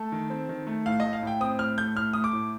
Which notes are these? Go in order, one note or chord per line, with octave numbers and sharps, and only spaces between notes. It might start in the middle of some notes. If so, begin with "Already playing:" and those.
Already playing: A3 A4
D#3
C4
D#3
A3
A2 F5
A3 D#5
F5
A2 G5
C4 D#6
A2 F6
A3 G6
A2 F6
A3 D#6
D6
A2